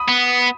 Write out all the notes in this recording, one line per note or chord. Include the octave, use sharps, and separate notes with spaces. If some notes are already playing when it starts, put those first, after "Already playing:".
Already playing: B5 D#6
B3